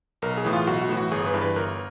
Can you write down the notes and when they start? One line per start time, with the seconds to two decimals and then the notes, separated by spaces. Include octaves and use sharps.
0.22 B1 A#4
0.37 G#4
0.45 A2 E3
0.53 F4
0.67 B1 F#4
0.82 F#4
0.89 A2 E3
0.97 F#4
1.11 G1 G#4
1.26 B4
1.34 G2 E3
1.41 B4
1.56 G1 A#4